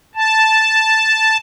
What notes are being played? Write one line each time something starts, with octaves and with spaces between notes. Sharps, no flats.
A5